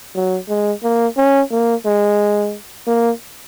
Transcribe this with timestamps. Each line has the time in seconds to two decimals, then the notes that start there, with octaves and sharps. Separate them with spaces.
0.15 F#3
0.49 G#3
0.83 A#3
1.17 C#4
1.51 A#3
1.85 G#3
2.87 A#3